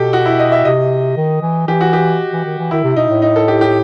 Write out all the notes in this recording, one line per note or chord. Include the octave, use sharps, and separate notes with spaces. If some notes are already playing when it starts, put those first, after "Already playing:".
Already playing: B2 G4 A4
F#4
E4
D#5
E5
C3 D#5
D#3
E3
E3 G4
F#4
G4
E3
D#3
E3
D#3 E4
C3
B2 D#4
A2
D#4
A4
G4
G4